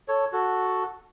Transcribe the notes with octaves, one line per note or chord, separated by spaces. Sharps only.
A4 C#5
F#4 A4